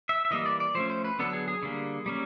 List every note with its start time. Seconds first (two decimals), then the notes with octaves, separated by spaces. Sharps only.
0.09 E5
0.25 E5
0.31 E3 G3 A#3 D#5
0.46 D5
0.60 D5
0.75 F3 A3 C#4 C5
0.90 C5
1.04 B4
1.19 D3 F#3 B3 D4 A4
1.33 G#4
1.48 G#4
1.63 D3 G3 A#3
2.06 G3 A#3 C#4